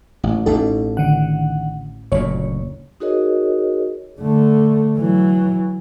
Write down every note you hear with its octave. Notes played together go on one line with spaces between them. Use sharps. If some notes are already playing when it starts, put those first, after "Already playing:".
A1
A1 B2 D#4 A4
D3 D#3 F#5
F#1 D2 A#2 C#5
D#4 F#4 G#4 A#4 C#5 D#5
D3 A3
E3 F#3